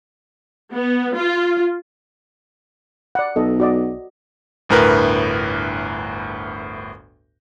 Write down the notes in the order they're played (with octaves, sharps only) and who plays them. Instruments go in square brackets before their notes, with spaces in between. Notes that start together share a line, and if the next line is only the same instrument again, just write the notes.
[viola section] B3
F4
[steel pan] D5 F#5
[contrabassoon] B1 [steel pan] A4 D#5
[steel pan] F#4 D5 D#5
[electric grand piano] G1 D2 A2 A#4 B4